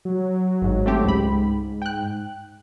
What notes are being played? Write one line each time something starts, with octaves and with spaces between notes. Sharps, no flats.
F#3
G#1 G#2
A3 C4 G4
C#2 G#2 B5
G5 F#6